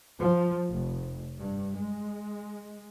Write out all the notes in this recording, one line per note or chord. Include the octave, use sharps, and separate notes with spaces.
F3
F1
G2
G#3